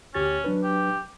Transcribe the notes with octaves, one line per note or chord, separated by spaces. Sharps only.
D2 C#4 G4 A6
F#3 D4 B4
G4